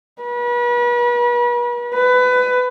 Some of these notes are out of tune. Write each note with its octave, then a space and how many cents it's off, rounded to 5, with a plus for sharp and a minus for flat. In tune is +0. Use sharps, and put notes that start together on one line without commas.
B4 -40
B4 +20